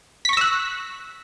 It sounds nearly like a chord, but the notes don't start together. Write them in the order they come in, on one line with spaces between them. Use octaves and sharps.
B6 C#6 A#6 E6 F#6